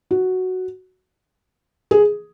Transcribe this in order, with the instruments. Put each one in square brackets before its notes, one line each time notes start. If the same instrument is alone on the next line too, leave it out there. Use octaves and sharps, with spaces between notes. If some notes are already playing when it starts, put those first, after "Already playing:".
[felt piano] F#4
G#4